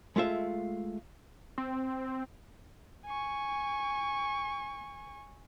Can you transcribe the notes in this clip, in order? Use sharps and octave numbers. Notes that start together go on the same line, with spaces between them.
G#3 A3 F4 E5
C4
G#5 C#6